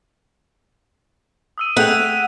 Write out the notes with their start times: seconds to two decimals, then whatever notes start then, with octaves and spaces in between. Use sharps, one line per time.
1.58 D#6 E6 D#7
1.77 A3 G#4 F#5 G5 B6 F7
2.05 D#7